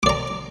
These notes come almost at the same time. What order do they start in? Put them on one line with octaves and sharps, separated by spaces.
D6 D5 A#5